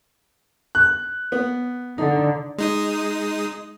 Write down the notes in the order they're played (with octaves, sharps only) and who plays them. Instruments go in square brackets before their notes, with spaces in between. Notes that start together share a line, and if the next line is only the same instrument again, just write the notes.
[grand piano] F#6
[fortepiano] B3
[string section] D3 [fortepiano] D#4
[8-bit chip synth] G#3 D#4 D#6